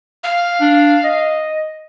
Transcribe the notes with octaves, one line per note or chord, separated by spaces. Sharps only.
F5
D4
D#5